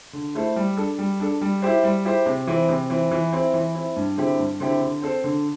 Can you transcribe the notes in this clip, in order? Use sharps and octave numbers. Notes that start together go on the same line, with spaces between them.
D3
A3 E4 A4 C5
G3
D4 A4
G3
D4 A4
G3
E4 G4 C5
G3
E4 G4 C5
C3
E3 C4
C3
E3 C4
E3
C4 E4
E3
C4 E4
G2
D3 C4 E4 G4
G2
D3 C4 E4 G4
D3
C4 A4 C5
D3